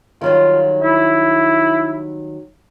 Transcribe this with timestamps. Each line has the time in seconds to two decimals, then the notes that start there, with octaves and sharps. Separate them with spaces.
0.21 D#3 F#3 G3 F4
0.82 E4